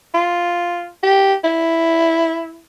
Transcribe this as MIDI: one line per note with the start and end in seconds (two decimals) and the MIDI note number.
0.14 0.88 65
1.03 1.34 67
1.44 2.61 64